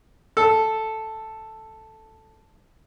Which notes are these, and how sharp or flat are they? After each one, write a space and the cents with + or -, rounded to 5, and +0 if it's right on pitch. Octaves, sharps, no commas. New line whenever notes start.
A4 +0 E6 +0